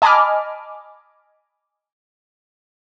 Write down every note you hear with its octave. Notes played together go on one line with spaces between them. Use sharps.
D#5 G#5 A5 B5 D6 F6